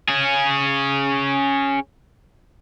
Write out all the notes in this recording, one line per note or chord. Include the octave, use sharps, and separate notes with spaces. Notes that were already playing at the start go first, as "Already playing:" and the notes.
C#4 G#4